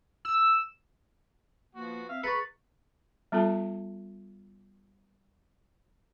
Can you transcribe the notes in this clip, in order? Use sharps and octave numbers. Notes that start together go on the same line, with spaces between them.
E6
F3 A#3 B3 F#4
C4 E5 F5
G#4 B4 A#5 B5 C#6 A6 C#7
G3 B3 F4 A4 A5